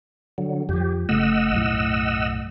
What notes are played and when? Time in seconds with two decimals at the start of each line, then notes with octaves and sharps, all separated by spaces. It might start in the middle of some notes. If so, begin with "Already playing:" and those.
0.38 D3 F#3
0.69 F2 F3 G4
1.09 F#1 C#3 A3 D#5 F#5 E6
1.52 B1 F#2 A2